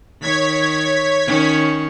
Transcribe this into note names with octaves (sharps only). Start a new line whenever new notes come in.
D#3 C#5 G#6 B6
D#3 C#4